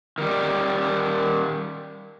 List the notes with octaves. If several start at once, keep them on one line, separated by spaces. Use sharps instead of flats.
D#3 G3